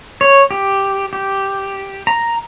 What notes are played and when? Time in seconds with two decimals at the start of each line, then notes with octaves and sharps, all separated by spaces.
0.21 C#5
0.51 G4
1.13 G4
2.07 A#5